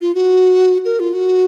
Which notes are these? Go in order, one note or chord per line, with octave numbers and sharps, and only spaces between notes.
F4
F#4
A#4
F4
F#4